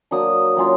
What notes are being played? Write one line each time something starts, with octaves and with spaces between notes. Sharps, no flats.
F#3 A#3 D4 D#6
F#3 A#3 C#4 F4